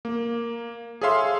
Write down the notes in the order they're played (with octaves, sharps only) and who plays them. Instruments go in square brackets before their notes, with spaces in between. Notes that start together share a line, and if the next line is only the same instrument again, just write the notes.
[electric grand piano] A#3
G#4 A4 C#5 E5 F5 C6